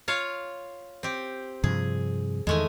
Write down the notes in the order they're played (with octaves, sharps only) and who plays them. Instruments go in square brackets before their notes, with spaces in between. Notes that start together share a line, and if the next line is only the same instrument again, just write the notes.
[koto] F4 C#5 F5
C4 G4
[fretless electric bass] G2 C3 F3 [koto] G#4
[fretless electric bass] E2 D#3 [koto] G#3 A3 G#5